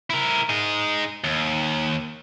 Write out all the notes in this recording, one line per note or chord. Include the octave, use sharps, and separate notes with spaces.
E4 A#4
D#4 G#4
D#2